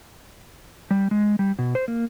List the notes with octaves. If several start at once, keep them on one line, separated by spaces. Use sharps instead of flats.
G3
G#3
G3
B2
C5
A#3